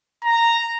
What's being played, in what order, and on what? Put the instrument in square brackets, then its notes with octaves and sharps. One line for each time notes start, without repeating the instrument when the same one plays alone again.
[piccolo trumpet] A#5